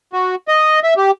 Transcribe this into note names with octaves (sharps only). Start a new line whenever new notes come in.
F#4
D#5
E5
G4